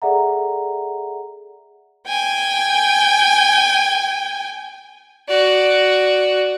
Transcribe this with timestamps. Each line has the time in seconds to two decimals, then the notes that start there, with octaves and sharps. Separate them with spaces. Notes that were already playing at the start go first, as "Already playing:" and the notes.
0.02 G#4 A4 D5 E5 F#5 A#5
2.07 G5 G#5
5.28 F#4 D5